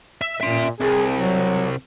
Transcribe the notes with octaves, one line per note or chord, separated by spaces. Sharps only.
E5
A#2 E5 C6
C2 G#4
F#3